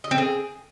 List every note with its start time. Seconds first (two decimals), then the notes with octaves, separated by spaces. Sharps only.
0.04 D#5
0.11 C4
0.18 G#4